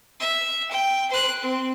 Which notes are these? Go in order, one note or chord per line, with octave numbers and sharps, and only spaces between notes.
E5
G5
C5 F#6
C4